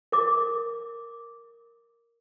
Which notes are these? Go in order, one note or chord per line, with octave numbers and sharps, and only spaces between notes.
A#4 D6